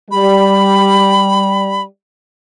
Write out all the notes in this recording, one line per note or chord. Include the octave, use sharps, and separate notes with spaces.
G3 B5